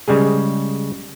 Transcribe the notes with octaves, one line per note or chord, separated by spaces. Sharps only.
C#3 G3 G#3 G#4